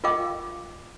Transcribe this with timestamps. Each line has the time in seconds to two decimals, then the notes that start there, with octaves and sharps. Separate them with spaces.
0.04 F4 A#4 D#5 F5 G5 D6